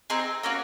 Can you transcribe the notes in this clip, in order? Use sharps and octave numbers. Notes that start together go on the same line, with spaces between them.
C4 D#4 G#4
A#3 C#4 F#4